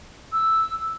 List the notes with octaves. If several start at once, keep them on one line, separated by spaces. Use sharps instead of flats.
E6